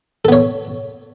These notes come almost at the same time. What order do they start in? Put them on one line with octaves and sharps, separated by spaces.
A4 B3 C#5